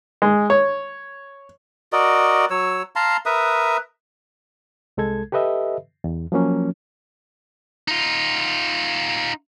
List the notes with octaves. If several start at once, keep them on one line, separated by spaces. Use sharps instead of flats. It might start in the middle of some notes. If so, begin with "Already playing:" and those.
G#3
C#5
F#4 A#4 D5 D#5
F#3 C#5 E6
F5 A5 A#5 C6
A#4 B4 E5 D#6
C2 G#3 A4 G#6
G4 A4 B4 D#5 E5
E2
F3 F#3 A#3 C#4
D#4 F4